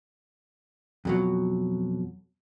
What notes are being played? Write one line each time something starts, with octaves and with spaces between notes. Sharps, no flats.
F2 B2 F#3